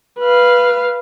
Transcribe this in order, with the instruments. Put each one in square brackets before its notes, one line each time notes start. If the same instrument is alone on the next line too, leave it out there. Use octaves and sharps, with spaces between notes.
[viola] B4 F5